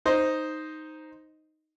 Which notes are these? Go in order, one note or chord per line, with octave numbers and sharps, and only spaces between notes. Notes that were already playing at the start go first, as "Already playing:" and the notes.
D#4 C5 D#5